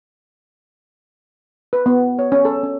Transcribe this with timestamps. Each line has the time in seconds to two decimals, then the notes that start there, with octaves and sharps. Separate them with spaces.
1.73 B4
1.86 B3
2.19 C#5
2.32 C#4
2.45 A4
2.63 C#4